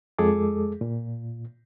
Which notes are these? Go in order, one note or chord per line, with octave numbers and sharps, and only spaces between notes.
F2 G#3 G#4 A4 D6
A#2